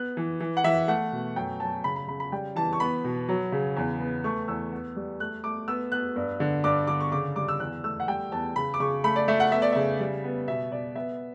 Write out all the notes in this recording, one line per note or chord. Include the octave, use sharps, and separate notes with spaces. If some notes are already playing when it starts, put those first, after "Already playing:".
Already playing: B3 F#6
E3
E3
F#5
E3 E5
A3 F#5
B2
F#2 G5
F#2 A5
C#3 B5
B5
C#3 B5
B5
G3 G5
E3 A5
C#6
B3 B5
B2
F#3
C#3
E2
B3
A3 C#6
E2 E6
B3
G3
A3 F#6
A3 D6
B3 E6
B3 F#6
G2
D3
G2 D6
D3 D6
C#6
C#3 D6
G3 D6
E6
E2 F#6
A3 E6
F#5
G3 G5
E2 A5
C#3 B5
D6
C#3 C#6
A3 B5
D5
A3 E5
F#5
B3 E5
D5
C#3 E5
G3
B3
B2 E5
B2 D5
B3 E5